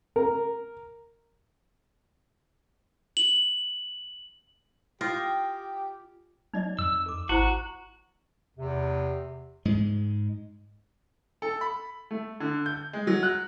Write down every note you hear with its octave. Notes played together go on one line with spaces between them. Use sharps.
A#4
F#7
F4 G4 D#5 F5 G5 G#5
F#3 D#4 D5 D#5
F2 E6
A4 D6
G#1 E4 F#4 C5 A#5
E2 C3
G#2 G#3
A4
B5
A3
D3
G6
G#3
F#3
F#6